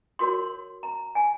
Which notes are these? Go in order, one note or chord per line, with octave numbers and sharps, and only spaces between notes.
F#4 A#4 C#5 C6
A#5
G#5